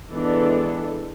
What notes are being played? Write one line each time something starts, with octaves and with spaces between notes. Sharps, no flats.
E3 G#3 B3 D4 A4